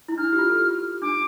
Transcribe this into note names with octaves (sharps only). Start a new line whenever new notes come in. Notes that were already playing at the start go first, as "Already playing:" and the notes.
E4
D4 F6
G4
F4
A4
G4
D4 D6